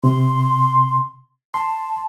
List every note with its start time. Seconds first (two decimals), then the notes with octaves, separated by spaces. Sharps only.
0.04 C3 C6
1.54 A5 C6